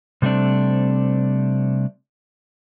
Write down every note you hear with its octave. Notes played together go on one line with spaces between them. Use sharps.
C3 G3 A3 C4 D4